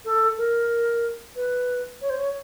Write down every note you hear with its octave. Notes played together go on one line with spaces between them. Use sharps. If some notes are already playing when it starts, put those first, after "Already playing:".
A4
A#4
B4
C#5
C5
C#5